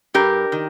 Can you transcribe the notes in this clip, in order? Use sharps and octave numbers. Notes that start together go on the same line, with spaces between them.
G2 G4 A#4
D#3